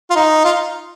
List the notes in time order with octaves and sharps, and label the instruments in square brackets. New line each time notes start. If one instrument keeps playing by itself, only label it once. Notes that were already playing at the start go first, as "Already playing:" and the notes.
[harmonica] F4
D#4
F4